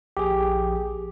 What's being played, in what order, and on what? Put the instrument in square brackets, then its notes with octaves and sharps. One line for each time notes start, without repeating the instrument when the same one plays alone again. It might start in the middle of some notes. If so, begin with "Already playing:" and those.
[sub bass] A#1 [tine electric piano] G4 G#4